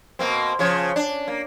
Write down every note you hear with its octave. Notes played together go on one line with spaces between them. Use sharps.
B2 A#3 C4
C#3 F3 C#5
D4
A#3